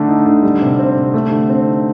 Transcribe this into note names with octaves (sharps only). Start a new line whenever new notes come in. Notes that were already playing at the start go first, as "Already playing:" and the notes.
Already playing: D3 A3
D#4
D3
G3
C3
C4
C3
A3
D3
C4
D#4